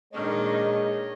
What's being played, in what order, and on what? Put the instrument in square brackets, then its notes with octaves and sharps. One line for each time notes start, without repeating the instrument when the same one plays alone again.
[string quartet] A#2 D#3 D4 [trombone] G#3 [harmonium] C#5 D#5